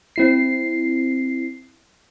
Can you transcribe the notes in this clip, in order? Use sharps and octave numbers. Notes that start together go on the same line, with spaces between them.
C4 E4 C7